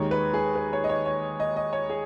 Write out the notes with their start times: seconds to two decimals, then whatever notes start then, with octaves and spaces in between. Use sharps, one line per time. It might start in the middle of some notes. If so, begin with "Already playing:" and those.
Already playing: D#2 D#3 G#3 C#5
0.11 B4
0.34 G#4
0.55 B4
0.73 C#5
0.84 D#5
0.89 C#5
1.06 C#5
1.40 D#5
1.57 D#5
1.73 C#5
1.90 G#4